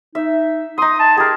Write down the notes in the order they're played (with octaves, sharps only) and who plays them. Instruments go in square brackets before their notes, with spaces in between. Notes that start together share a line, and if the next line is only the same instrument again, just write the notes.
[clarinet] D#4 [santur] E5
[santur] D#4 C6 [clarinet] D#6
[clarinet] A5
[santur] G4 A#4 [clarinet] G#4